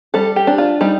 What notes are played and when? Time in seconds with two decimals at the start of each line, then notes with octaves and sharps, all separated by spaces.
0.14 G3 A4
0.36 G4
0.47 D4
0.58 F4
0.81 G3 D#4